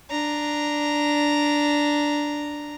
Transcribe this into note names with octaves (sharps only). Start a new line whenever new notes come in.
D4 A#5